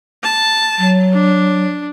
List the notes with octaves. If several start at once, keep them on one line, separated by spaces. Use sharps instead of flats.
A5
F#3
D4